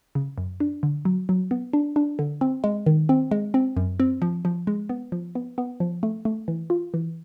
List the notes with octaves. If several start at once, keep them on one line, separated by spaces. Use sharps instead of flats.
C#3
F#2
D4
D3
F#3
F#3
B3
D4
D4
D3
C4
G#3
D#3
C4
G#3
C4
F#2
C4
F3
F3
G#3
B3
F3
B3
B3
F3
A3
A3
E3
F4
E3